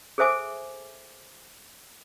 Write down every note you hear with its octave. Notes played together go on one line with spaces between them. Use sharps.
G#4 A4 C5 E5 G#5 D6